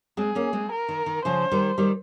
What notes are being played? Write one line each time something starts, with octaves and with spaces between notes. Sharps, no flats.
G#3 C4 G#4
A#3 C#4
G#3 C4
A#4
D#3
D#3
C#3 F3 C5
D#3 G3
D#3 G3